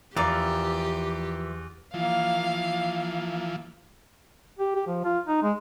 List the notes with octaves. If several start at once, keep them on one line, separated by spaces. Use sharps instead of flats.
E2 E3 F3 G4 A#4 D5 F5
E3 F3 A#3 F5
A#3
G4
G4
F3
F4
D#4
G#3